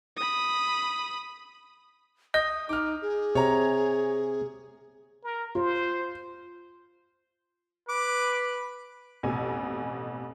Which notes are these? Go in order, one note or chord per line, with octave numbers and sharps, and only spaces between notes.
B5 D#6
D#5 D#6 G6
D#4 D6 F6
G#4
C3 C#5 A#5
A#4
F4 C5
B4 D6
A1 F2 B2 G#5